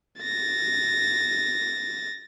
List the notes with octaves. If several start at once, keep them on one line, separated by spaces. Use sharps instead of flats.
A6 A#6